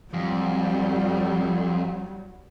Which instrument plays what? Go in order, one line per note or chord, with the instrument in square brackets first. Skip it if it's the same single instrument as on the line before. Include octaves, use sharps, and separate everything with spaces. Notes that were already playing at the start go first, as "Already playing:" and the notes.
[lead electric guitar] F2 [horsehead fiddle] F#3 G3